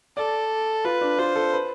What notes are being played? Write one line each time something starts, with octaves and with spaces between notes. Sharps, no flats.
A4 D5
F4 B4
D4
F4 C5
A4
B4